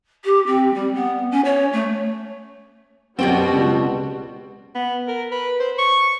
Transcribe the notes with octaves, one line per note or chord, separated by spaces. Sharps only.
G4
C4
G3
B3
C#4
C#5
A3
F#2 B2 G3 C4 F#4 G5 A5
C#2
B3
A#4
B4
C5
C#6